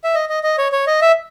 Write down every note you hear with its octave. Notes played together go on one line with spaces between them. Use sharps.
E5
D#5
D#5
D#5
C#5
C#5
D#5
E5